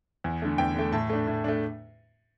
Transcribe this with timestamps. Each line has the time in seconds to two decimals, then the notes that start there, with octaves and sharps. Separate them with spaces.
0.24 E2
0.42 D3 A3
0.58 E2 G5
0.75 D3 A3
0.92 A2 A5
1.10 A3 D4
1.27 A2
1.44 A3 D4